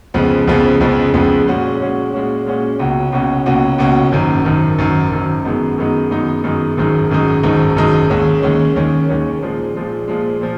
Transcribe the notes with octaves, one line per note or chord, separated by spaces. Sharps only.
F2 C#3 F3 G#3 B3
F2 C#3 F3 G#3 B3
F2 C#3 F3 G#3 B3
F2 C#3 F3 G#3 B3
A#2 G#3 C#4 F#4
A#2 G#3 C#4 F#4
A#2 G#3 C#4 F#4
A#2 G#3 C#4 F#4
C#2 B2 A#3 C#4 F#4
C#2 B2 A#3 C#4 F#4
C#2 B2 A#3 C#4 F#4
C#2 B2 A#3 C#4 F#4
G#1 F#2 D#3
G#1 F#2 D#3
G#1 F#2 D#3
G#1 F#2 D#3
F#2 D#3 G#3 B3 D#4
F#2 D#3 G#3 B3 D#4
F#2 D#3 G#3 B3 D#4
F#2 D#3 G#3 B3 D#4
G#1 F#2 D#3 G#3 D#4
G#1 F#2 D#3 G#3 D#4
G#1 F#2 D#3 G#3 D#4
G#1 F#2 D#3 G#3 D#4
D#2 D#3 G#3 C#4
D#2 D#3 G#3 C#4
D#2 D#3 G#3 C#4
D#2 D#3 G#3 C#4
A#2 F3 G#3
A#2 F3 G#3
A#2 F3 G#3
A#2 F3